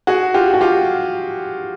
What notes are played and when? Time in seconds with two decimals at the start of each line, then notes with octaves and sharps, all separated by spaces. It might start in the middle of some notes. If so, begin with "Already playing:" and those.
0.07 F#4 G#4
0.34 F4 G4
0.54 F#4
0.61 F4 G4